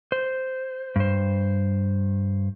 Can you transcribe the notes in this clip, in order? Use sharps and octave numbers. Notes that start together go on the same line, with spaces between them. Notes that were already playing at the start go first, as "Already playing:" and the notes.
C5
G2 C5